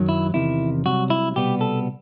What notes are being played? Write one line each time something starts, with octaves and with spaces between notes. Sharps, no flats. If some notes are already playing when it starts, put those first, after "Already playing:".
Already playing: F#2 D#3 F#3
E4
E2 C3 D#3 E4
C2 C3 F#3 F#4
E4
C2 B2 G3 B3 G4
A4